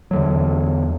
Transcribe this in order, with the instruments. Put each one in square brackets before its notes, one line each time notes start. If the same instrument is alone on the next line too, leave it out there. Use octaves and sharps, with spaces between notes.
[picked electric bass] E2 D3 F#3